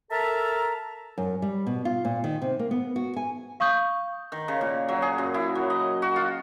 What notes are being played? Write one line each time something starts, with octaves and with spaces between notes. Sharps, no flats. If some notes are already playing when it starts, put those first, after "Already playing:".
A4 A#4 E5 A5 A#5
F#2
G3
B2
F4
A#2
D#3
C3
A#3
B3
F#4
G#5
F5 C#6 D#6 G6
D#3
C#3
A#2
F#3
G#4
F#2
E4
F#3
D#5
F#4
F4